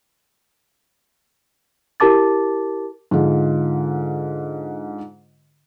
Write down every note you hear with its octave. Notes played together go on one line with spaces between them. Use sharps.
E4 G4 A#4 A5 D6 A6
G#2 D3 F4